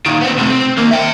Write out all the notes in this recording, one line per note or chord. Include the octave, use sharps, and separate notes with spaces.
A#2 D#3
B3 C4
C3 A3
C4
D#2 A#3
E5 G5